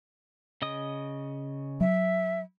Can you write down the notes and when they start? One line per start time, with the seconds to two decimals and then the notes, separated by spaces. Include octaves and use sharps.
0.62 C#3 D#5 D#6
1.81 F#3 E5